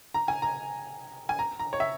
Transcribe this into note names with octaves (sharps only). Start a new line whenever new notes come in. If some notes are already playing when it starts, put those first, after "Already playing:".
A#5
G#5
A#5
G#5
A#5
A#5
C#5
E5